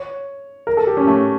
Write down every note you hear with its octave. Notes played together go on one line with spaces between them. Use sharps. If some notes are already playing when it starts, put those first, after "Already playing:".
Already playing: C#5
A#4
A4
G4
C#4
A3